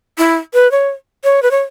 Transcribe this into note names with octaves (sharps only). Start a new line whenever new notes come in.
E4
B4
C#5
C#5
B4
C#5